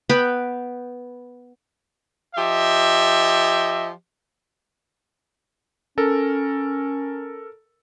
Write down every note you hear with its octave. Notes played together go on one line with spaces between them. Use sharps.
B3 B4 G5 B5
F3 G4 D#5 E5
C#4 A4 A#4